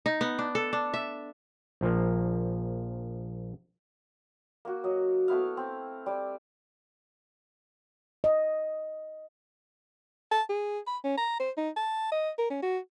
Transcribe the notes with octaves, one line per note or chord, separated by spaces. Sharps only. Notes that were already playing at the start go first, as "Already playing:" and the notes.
D#4
B3
D4
A4
D4
E5
A#1 F3 A#3
A#3 F#4
F#3 D#5
A3 B3 E4 F5
C4
G3 D5
D#5
A5
G#4
B5
C#4
A#5
C5
D#4
A5
D#5
A#4
C#4
F#4